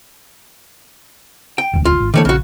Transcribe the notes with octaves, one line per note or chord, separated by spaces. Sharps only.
G5
E1 D2
F4
G#1
D3 E3 G3 A3 A#3 C#5
A#1 C#3 F#4